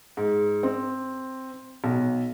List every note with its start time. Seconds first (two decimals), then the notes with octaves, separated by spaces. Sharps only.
0.17 G#2
0.63 C4
1.84 B1